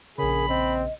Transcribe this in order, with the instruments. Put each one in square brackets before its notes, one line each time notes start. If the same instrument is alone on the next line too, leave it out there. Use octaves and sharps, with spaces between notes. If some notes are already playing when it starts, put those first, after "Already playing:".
[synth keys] A#1 C#3 [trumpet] G#4 [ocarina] A#4 [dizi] B5
[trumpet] C4 [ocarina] D#5